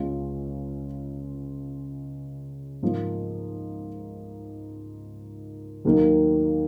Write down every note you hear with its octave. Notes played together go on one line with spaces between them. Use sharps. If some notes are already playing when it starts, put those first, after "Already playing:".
Already playing: C#2 C#3 G#3 C#4 F4
G#2 F3 A#3
D#2 D#3 F#3 A#3 D#4